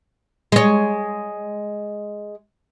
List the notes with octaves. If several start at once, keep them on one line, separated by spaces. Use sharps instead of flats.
G#3 C#5